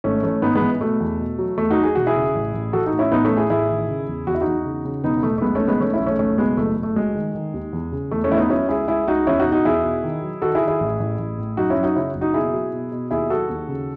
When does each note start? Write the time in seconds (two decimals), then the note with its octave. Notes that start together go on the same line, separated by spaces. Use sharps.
0.04 G#1 A3 C#4
0.23 E3 A3 C#4
0.42 G#1 B3 D#4
0.55 G#3 B3
0.62 E3
0.81 B2 A3
1.00 E2
1.20 B2
1.39 F#3
1.58 E2 A3
1.70 D#4 F#4
1.77 F#3
1.83 G#4
1.95 E1 F#4
2.07 E4 G#4
2.16 C#3
2.35 A1
2.54 A1
2.73 E3 F#4 A4
2.86 D#4 F#4
2.92 A2
2.99 C#4 E4
3.12 A1 B3 D#4
3.24 A3 C#4
3.31 A1
3.37 E4 G#4
3.50 A1 E4 G#4
3.69 D#3
3.88 C#3
4.08 E2
4.27 E2 F#4
4.34 E4
4.41 E2 D#4 F#4
4.65 C#3
4.85 C#3
5.04 E1 B3 D#4
5.17 B3
5.23 E1 A3
5.38 A3
5.42 B1 G#3 B3
5.55 A3 C#4
5.61 B1
5.68 G#3 B3
5.80 E3 A3 C#4
5.93 C#4 E4
6.00 B1
6.06 A3 C#4
6.19 F#1 A3 C#4
6.38 B2 G#3 B3
6.57 F#1 A3
6.77 F#1
6.83 A3
6.96 F#3 G#3
7.15 D#3
7.35 D#3
7.54 D#2
7.73 E2
7.92 C#3
8.11 E2 A3
8.24 A3 C#4
8.30 E2 E4
8.37 B3 D#4
8.50 F#3 C#4 E4
8.69 C#2 E4 G#4
8.88 C#2 E4 G#4
9.07 C#2 D#4 F#4
9.27 E2 C#4 E4
9.39 D#4 F#4
9.46 B2
9.52 D#4 F#4
9.65 E2 E4 G#4
9.84 B2
10.03 D#3
10.23 F#3
10.42 D#3 F#4 A4
10.55 E4 G#4
10.61 D#3
10.68 E4 G#4
10.80 A1
11.00 A1
11.19 A1
11.38 A2
11.57 F#2 D#4 F#4
11.70 C#4 E4
11.76 F#2
11.83 D#4 F#4
11.96 C#3 C#4 E4
12.15 F#1
12.21 D#4 F#4
12.34 B2 E4 G#4
12.53 F#3
12.73 B2
12.92 B2
13.11 D#2 E4 G#4
13.30 F#3 F#4 A4
13.50 D#2
13.68 C#3